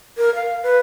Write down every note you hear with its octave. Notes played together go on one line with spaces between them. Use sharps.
A#4
F5
B4